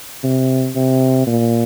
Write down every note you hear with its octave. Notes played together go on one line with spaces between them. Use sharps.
C3
C3
A#2